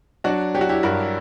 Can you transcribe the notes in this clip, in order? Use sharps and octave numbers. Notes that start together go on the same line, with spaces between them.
F#3 D4 F#4
F#3 G4
F#4
E4 G4
G2 F#4 A#4